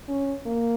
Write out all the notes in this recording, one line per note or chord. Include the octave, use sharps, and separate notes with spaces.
C#4
A#3